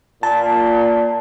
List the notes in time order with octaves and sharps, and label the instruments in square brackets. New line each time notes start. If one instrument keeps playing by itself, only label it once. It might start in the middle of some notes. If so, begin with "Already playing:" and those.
[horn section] A#2 [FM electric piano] A5